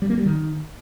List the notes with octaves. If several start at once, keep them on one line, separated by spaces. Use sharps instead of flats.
G3
A#3
G3
D#3